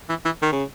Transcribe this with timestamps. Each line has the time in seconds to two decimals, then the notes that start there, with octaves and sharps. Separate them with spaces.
0.09 E3
0.25 E3
0.42 D#3
0.52 C#3